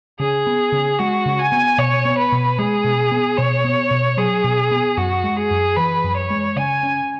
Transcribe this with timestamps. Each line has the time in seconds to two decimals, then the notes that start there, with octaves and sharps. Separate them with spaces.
0.20 C#3 G#4
0.47 B3
0.72 C#3
0.99 G#3 F#4
1.26 C#3
1.39 G#5
1.52 B3
1.78 B2 C#5
2.05 B3
2.18 B4
2.32 B2
2.59 G#3 G#4
2.84 B2
3.12 B3
3.38 B2 C#5
3.64 B3
3.91 B2
4.17 F#3 G#4
4.44 B2
4.71 B3
4.97 F#2 F#4
5.24 G#3
5.37 G#4
5.51 F#2
5.76 E3 B4
6.04 F#2
6.17 C#5
6.31 G#3
6.56 C#3 G#5
6.83 C#4